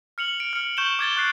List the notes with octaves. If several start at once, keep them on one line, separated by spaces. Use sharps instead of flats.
F6 C#7 F7 F#7
D7
F6 C#7
C#6 G6 E7 F#7 G7
D6 G#6 A6 G7
C#6 F#6 C7 D7